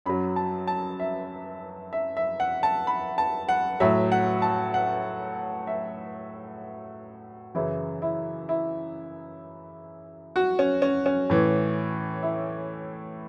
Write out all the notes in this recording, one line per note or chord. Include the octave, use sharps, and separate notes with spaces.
F#2 F#3 B5
A5
A5
E5
E5
E5
F#5
A5
B5
A5
F#5
A2 F#3 E5
F#5
A5
F#5
E5
F#2 C#3 E3 E4
E4
E4
F#4
C#4
C#4
C#4
A2 E3
E4